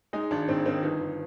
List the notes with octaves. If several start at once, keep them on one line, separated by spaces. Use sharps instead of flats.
G#3 D#4
G#1 D4
G#2 C4
D#3 C4
G1 D#4
G1